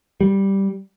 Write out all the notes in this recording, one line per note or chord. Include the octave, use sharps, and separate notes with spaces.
G3